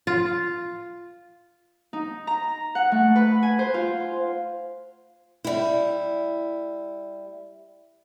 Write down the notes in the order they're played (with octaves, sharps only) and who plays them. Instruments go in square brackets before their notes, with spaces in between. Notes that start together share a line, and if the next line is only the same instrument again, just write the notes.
[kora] F4
[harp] D#4
A#5
F#5
A3
B4
G#5
C5
F4
[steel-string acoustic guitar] G3 E4